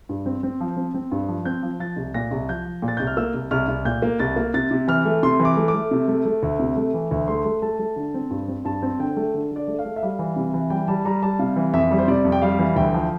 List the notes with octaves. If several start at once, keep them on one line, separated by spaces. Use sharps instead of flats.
G2
C4
C4
F3
C4
C4
G2
F3
C4 G6
F3
F3 A6
C2
A#2 A#6
C2
F3 G6
F3
A#2
A6
C2 G6
F6
A#3 E6
C2
C2 F6
C2
A#2 G6
A#3
C2 A6
A#3
C3 A6
C3
E3 F6
A3
C3 C6
E3
D6
A3
D6
A3
C3
A3
A3
D2
C3
A3
E3
D2
A3 C6
A3
A3 A5
A3
D3
C4
G2
C4
G2 A5
C4
D3 G5
A3
D3
D3 D5
A3
F5
A3
E5
G3 F5
E3
C3
E3
G3 G5
G3 A5
G3 A#5
G3 A5
C3 F5
E3
F2 E5
G3
C5
C3 D5
F2
G5
G3 F5
E3
D2 G5
F3